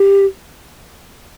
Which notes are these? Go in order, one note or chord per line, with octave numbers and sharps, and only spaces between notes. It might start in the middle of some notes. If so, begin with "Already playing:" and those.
Already playing: G4